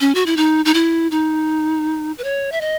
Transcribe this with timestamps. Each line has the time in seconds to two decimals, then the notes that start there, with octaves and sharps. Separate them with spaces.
0.01 C#4
0.15 F#4
0.26 E4
0.37 D#4
0.65 D#4
0.74 E4
1.11 D#4
2.18 B4
2.24 C#5
2.52 E5
2.61 D#5